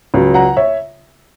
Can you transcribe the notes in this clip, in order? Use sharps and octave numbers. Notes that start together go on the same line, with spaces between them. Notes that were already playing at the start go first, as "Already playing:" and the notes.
C#2 C#3 F#3
F#5 A#5
C#5 E5